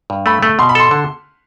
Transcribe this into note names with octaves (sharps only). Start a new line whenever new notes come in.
G2
A3 B5
A3
B2 C6
B5
A4 C6
D3